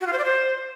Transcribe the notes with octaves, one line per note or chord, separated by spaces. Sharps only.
F#4
F4
C5
D5
C5